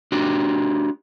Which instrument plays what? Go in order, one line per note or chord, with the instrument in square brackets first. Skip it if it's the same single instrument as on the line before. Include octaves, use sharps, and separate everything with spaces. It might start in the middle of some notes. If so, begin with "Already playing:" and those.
[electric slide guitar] D4 F#4 G4